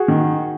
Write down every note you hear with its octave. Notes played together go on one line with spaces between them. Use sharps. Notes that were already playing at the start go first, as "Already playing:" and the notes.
Already playing: F#4 G#4
D#3